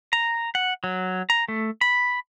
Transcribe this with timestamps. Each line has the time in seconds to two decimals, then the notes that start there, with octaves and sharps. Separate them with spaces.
0.13 A#5
0.55 F#5
0.84 F#3
1.30 A#5
1.48 A3
1.81 B5